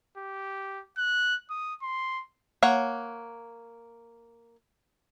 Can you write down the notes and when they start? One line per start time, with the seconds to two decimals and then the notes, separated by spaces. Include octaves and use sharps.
0.18 G4
0.97 F#6
1.50 D#6
1.82 C6
2.62 A#3 C#5 F#5